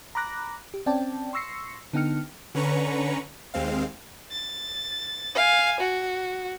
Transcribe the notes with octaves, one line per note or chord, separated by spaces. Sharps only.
A#5 B5 D6 F#6 A#6
G4
C4 C#4 D5 G5 A5
C6 C#6 E6 A#6 C7 C#7
D3 B3 D#4 G5 F6 C#7
D3 C#4 B4 A#5 C#6
D#2 G#3 C4 F5
A6
F5 G#5
F#4